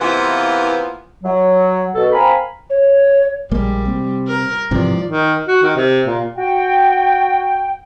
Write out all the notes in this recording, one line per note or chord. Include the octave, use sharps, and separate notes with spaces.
C3 E3 A#3 B3 E4 F4
F#3
B2 A4
C4 A#4 F5 G#5 B5
C#5
A#1 G3 G#3 A#3
C3
A#4
G#2 C3 E3 F3 D5
D#3
F#4
D#3
C3
A#2
F#4 G5